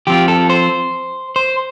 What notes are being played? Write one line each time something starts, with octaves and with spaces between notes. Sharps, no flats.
F3 C4 F4 G4
A4
C5
C5